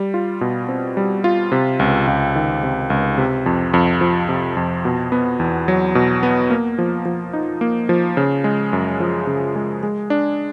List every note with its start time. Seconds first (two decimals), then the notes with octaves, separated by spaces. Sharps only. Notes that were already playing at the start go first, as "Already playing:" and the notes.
Already playing: G3
0.14 F4
0.41 B2
0.69 C4
0.97 G3
1.24 F4
1.52 C3
1.79 C#2
2.07 C#2
2.35 D#3
2.63 C3
2.90 C#2
3.18 C3
3.46 F2
3.74 F2
4.01 F3
4.29 C3
4.57 F2
4.85 B2
5.12 B3
5.40 E2
5.68 F#3
5.95 B2
6.23 B3
6.50 A#3
6.78 F3
7.05 F3
7.33 D#4
7.61 A#3
7.89 F3
8.17 C#3
8.44 G#3
8.73 F#2
9.00 F3
9.27 C#3
9.56 G#3
9.83 G#3
10.10 D4